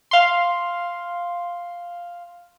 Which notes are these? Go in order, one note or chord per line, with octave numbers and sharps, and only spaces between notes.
F5 C6